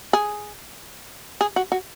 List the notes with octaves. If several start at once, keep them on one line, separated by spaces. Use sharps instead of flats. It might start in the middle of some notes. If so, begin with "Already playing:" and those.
G#4
G#4
F#4
F#4